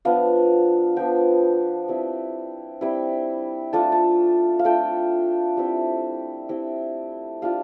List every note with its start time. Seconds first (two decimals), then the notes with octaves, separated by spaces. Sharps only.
0.05 F3 B3 D4 F5
0.96 F3 B3 D4 G5
1.88 G3 C4 E4
2.81 G3 C4 E4
3.73 A3 D4 F4 A5
3.92 A5
4.59 F5
4.65 A3 D4 F4 G5
5.57 G3 C4 E4
6.49 G3 C4 E4
7.42 G3 D4 F4 F5